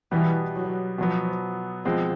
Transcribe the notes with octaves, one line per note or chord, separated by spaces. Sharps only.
B2 E3 G3 B3
F#3
B2 F3 F#3 B3
B2 F3 G#3 C4